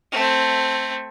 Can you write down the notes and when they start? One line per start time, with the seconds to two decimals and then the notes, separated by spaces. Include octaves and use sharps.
0.12 A3 C4